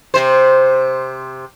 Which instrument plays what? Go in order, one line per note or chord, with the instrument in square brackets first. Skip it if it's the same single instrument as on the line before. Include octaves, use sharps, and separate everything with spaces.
[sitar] C3 C5